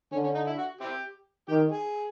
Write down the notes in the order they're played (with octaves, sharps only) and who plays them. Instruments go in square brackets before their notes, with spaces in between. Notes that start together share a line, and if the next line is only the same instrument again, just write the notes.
[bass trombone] D3 [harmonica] C#4
[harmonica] C#4
D#4
E4
F#4
C4 E4 G4
[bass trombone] D#3 [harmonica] G4
[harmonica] G#4